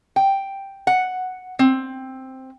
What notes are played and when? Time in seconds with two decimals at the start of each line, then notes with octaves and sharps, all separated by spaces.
0.16 G5
0.87 F#5
1.59 C4